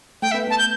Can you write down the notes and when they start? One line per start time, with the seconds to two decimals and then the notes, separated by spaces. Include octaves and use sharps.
0.22 A3 A4 G5
0.31 E5
0.34 B3 B4
0.47 A3 A4 A5
0.58 G6